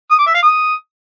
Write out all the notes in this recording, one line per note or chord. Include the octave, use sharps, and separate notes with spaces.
D#6
D6
E5
F5
D#6